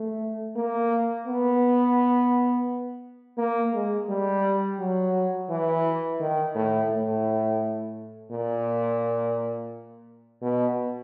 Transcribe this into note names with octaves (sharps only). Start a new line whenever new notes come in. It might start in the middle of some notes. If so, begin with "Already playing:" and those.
Already playing: A3
A#3
B3
A#3
G#3
G3
F#3
E3
D#3
A2
A2
A#2
B2